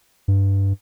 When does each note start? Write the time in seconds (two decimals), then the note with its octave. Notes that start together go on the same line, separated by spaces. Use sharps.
0.28 G2